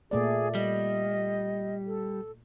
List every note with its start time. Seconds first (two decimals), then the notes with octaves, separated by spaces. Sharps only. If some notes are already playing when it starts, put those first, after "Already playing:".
0.11 A#2 A3 G#4 D5
0.55 G3 D#5
1.86 A4